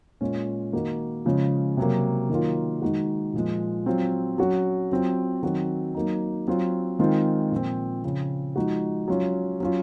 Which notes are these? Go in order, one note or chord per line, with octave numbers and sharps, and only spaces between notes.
A#2 G#3 C#4 F4
D#3 A#3 D#4 F#4
C#3 F3 G#3 C#4
C3 F#3 A#3
D#3 F#3 A#3 F4
D#3 G#3 D#4 F#4
A#2 F3 G#3
F#3 C4 F4
F#3 C#4 F#4
F#3 C4 F4
D#3 F#3 C4 F#4
F#3 A#3 D#4
F#3 C4 F4
D#3 G#3 C4 F4
A#2 F3 C4
C#3 F3 C4
F3 G#3 D#4 F#4
F#3 C#4 F4
F#3 C#4 F4